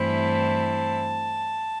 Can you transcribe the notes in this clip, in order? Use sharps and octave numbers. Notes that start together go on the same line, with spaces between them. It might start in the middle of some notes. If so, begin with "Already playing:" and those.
Already playing: G2 E3 A3 C4 E4
A5